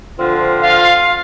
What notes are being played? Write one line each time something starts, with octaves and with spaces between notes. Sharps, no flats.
D3 F3 C4 F4
F4 F5